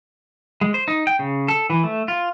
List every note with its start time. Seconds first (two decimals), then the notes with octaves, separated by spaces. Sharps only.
0.61 G#3
0.74 C5
0.88 D#4
1.07 G5
1.19 C#3
1.48 A4
1.70 E3
1.84 A3
2.08 F4